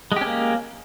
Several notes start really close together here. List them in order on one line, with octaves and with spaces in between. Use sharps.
G#3 G4 C#4 A#3